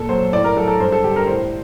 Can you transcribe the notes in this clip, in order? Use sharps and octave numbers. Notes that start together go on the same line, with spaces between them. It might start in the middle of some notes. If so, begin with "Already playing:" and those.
Already playing: A#2 A4
F#3 C5
A2 D5
A#4
F#3 A4
A4
G2 C5
A4
D3 G3 G4
A#4
A2 C5